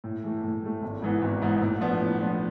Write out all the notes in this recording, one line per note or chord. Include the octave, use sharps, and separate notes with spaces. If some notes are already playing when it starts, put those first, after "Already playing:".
A2
E3 A3
A2
E3 A3
G#1
G#2 E3 B3
G#1
G#2 E3 B3
A2
F3 B3 D4
A2
F3 B3 D4